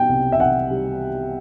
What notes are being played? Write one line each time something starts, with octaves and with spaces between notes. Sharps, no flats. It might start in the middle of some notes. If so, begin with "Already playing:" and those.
Already playing: B2 G3 G5
C2
E5
C2 F#5
G3